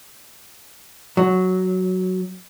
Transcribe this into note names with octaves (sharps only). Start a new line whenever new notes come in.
F#3